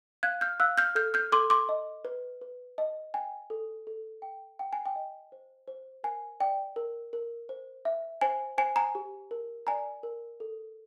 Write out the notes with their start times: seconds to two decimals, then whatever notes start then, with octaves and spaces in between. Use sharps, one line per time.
0.23 F5 F#6 G#6
0.41 F6 G6
0.60 F5 E6 F#6
0.78 F6 G6
0.95 A4 F6 G6
1.14 F6 G6
1.32 A4 C6 D6
1.50 C6 D6
1.69 D#5
2.05 B4
2.42 B4
2.78 D#5
3.14 G5 G#5
3.50 A4
3.87 A4
4.22 G5
4.59 F#5 G5
4.73 G#5
4.86 G5
4.96 D#5
5.32 C5
5.68 C5
6.04 A#4 G#5
6.40 D5 G5
6.76 A#4
7.13 A#4
7.49 C5
7.85 E5
8.21 C5 G#5
8.58 C5 G#5
8.76 G#5 A#5
8.95 G4
9.31 A#4
9.67 D5 G#5 A#5
10.03 A#4
10.40 A4